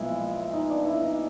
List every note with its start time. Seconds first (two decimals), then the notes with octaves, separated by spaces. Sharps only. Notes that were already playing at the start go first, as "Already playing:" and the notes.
Already playing: B1 A#2 F3 G#3 B3 E4
0.53 D#4 D#5
0.70 D4 D5
0.85 E4 E5
1.02 D#4 D#5